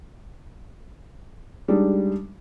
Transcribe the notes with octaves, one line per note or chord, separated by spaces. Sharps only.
G3 G#3 D4 D#4